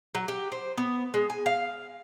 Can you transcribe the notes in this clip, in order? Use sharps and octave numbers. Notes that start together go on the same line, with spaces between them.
F#3
G4
C5
B3
G#3
G#5
F5